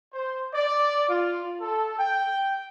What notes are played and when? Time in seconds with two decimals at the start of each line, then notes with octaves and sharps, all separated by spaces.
0.13 C5
0.54 D5
1.09 F4
1.61 A4
1.99 G5